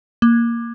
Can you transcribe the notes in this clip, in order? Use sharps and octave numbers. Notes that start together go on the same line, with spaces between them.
A#3